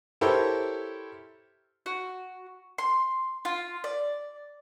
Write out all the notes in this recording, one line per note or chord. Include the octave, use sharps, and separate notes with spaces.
E4 G4 A4 A#4 C5 C#5
F#4
C6
F4
D5